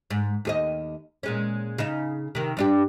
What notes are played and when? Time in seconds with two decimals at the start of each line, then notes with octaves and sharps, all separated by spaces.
0.10 G#2
0.45 D#2 G#4 D#5
1.23 A#2 G#3 C#4
1.78 C#3 D#4
2.35 C3 D#3
2.57 G2 D4 G4